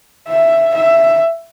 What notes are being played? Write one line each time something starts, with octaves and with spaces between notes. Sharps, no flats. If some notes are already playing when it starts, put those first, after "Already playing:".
E5
E5